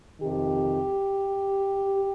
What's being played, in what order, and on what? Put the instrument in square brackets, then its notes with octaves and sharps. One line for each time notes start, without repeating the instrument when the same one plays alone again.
[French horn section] F2 C3 D#3 G4